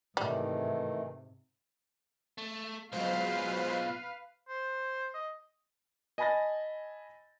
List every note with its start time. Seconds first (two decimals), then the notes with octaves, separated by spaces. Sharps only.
0.17 G#2 C3 D#3 E3 G3 A3
2.38 A3
2.92 B2 F#3 G#3 F4 B4 C5 F5
4.49 C5
5.14 D#5
6.18 D#5 G#5 A5 B5 A6 A#6